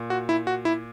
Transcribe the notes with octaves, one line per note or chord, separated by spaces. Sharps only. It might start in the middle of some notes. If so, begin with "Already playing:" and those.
Already playing: A#2
F#4
E4
F#4
E4